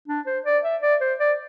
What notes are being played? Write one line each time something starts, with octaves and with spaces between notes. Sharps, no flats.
D4
C5
D5
E5
D5
C5
D5